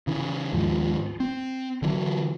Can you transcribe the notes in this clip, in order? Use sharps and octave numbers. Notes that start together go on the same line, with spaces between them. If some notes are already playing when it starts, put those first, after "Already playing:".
C#3 E3
D#2 G#2 F3
C4
D3 E3 F#3